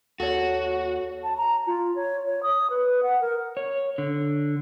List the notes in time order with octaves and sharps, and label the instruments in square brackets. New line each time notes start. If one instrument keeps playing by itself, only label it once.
[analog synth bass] D#2 [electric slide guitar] F#4 [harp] A4 C#5
[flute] A5
A#5
F4
C#5
C#5
D#6
B4
F#5
A#4
[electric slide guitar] C#5
D3